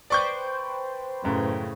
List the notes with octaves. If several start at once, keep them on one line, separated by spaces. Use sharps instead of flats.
B4 C5 D5 G5 C#6 G6
F#2 A2 C#3